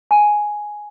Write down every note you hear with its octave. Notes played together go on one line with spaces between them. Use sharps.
G#5